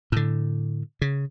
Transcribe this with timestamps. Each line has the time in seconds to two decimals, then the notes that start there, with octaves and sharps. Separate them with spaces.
0.12 A2 D3
1.02 C#3